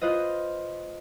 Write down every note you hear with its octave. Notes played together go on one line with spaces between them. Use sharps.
F4 B4 C5 D#5